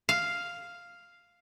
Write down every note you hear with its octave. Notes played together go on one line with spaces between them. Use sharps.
F5